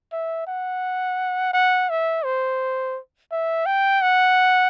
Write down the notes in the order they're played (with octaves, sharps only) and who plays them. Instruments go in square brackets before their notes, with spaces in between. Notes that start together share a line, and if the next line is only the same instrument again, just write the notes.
[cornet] E5
F#5
F#5
E5
C5
E5
G5
F#5